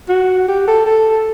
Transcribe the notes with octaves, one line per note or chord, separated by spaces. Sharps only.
F#4
G4
A4
A4